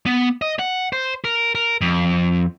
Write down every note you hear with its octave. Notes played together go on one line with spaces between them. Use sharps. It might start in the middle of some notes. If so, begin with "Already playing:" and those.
B3
D#5
F#5
C5
A#4
A#4
F2